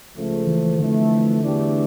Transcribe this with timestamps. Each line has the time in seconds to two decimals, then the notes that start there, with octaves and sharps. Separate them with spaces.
0.16 C#2 C#3 F3 A3
0.47 E3
0.79 F2 D3 E3 A3
1.42 E2 E3 A3 D4 G4